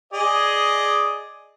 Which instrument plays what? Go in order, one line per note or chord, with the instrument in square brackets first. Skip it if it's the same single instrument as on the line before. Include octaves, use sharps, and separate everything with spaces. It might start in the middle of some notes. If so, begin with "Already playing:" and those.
[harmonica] G#4 D5 D#5